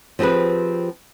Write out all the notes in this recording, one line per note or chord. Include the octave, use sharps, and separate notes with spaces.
F3 C4 G4 G#4 B4